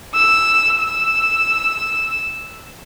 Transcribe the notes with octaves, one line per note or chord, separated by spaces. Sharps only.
E6
E6